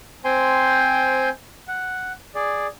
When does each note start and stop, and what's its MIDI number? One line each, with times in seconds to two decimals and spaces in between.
0.25 1.29 60
0.25 1.29 72
0.25 1.29 79
0.25 1.29 80
0.25 1.29 84
0.25 1.29 91
1.68 2.12 78
2.35 2.67 68
2.35 2.67 74